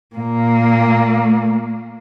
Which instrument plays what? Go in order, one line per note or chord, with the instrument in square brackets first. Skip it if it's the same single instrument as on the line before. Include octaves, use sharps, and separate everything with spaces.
[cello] A#2 A#3